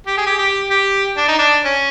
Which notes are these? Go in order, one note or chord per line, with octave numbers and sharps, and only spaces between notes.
G4
G#4
G4
G4
G4
D4
D#4
D4
C#4